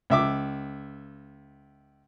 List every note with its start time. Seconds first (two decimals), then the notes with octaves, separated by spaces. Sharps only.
0.10 C#2 E5 D6